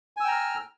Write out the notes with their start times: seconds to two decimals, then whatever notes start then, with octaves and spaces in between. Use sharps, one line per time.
0.17 G#5
0.21 E6
0.24 G5
0.28 A#5
0.32 F6